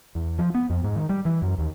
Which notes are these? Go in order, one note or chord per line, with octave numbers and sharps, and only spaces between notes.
E2
F3
B3
F2
G#2
D#3
G3
E3
F#2
D#2